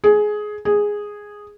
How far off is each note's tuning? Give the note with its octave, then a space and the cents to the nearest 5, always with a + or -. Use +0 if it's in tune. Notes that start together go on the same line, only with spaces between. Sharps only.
G#4 +15
G#4 -5